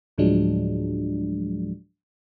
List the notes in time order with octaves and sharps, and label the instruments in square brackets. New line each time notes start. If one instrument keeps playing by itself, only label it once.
[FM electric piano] D2 A2 F3 F#3 G#3 D4